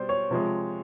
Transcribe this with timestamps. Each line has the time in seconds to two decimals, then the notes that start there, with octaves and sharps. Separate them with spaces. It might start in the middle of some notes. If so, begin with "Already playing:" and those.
Already playing: B2 G3 C5 D5
0.09 C#5
0.31 C3 F3 G#3